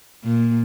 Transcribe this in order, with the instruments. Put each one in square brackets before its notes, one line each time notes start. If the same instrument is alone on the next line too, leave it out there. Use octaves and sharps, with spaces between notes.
[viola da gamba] A#2